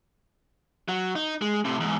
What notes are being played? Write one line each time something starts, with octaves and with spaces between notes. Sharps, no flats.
F#3
D#4
G#3
A2 C3
E2 G#2